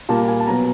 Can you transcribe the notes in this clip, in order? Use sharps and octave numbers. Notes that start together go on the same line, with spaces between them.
A#2 G3 A#3 A5
G#5
A5
B2 F#3 B3 A#5